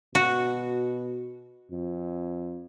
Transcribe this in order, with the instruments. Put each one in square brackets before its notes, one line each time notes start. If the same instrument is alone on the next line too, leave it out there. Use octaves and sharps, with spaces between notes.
[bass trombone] B2 [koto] F#4
[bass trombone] F2